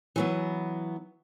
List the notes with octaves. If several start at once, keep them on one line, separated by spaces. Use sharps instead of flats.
E3 F#3 B3